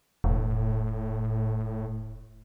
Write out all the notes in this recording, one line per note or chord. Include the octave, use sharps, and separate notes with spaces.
E1 A2